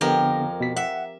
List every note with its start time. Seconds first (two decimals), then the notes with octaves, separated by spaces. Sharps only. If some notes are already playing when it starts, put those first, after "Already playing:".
0.01 F2 D3 B3 G4 A#4
0.60 B2 B6
0.76 E5 F#5